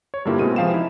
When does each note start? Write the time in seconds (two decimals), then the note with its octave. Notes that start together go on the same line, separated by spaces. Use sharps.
0.14 C#5
0.25 G2 D3 A#3 E4 F4 G4
0.39 B2 G#3 C4 D#7
0.56 C3 E3 F3 F5 G5 E7
0.74 D#4 E4